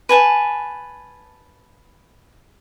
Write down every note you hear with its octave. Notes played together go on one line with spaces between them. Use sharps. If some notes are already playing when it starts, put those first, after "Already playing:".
B4 G#5 A5